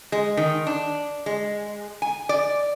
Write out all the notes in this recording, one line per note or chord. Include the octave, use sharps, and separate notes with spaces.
G#3
D#3
D4
G#3
G#5
D5